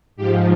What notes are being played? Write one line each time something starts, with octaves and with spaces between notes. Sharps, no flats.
G#2 F3 G4